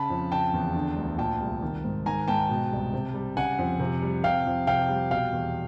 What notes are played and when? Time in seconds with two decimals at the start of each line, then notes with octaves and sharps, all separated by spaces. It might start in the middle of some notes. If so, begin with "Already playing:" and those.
Already playing: C#3 A5 B5
0.10 F2
0.32 C#3 G5 A5
0.53 E2
0.75 D3
0.97 D2
1.18 A#2 G5 A5
1.41 C2
1.62 D#3
1.84 G#2
2.06 D#3 G#5 A#5
2.28 G#2 G5 A5
2.49 B2
2.72 C2
2.93 C3
3.14 G3
3.36 C#3 F#5 G#5
3.59 F2
3.80 C3
4.02 G3
4.24 C3 F5 G5
4.46 F2
4.67 C3 F5 G5
4.89 G3
5.11 B2 F5 G5
5.32 E2